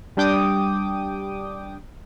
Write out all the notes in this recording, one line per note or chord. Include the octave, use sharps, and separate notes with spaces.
G3 D4 G5 D6 D#6